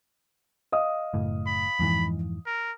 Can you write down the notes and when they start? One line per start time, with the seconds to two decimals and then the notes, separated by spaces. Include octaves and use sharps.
0.72 D#5 F5 D#6
1.14 F#1 A2
1.47 B5
1.79 F2 G#2 E3
2.46 A#4